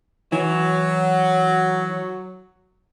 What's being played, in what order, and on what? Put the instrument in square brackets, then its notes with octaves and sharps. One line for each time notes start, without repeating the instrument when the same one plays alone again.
[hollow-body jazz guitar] E3 [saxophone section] F#3